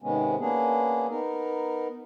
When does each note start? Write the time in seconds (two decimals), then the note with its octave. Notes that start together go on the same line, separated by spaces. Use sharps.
0.02 G#2 C3 D#3 G#3 B3 C#4
0.39 A#3 B3 C#4 D4 G#4
1.10 B3 D#4 A#4